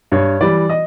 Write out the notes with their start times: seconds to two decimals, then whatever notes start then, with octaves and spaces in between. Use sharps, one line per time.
0.12 G2 C#5
0.41 E3 G3 D5
0.70 D#5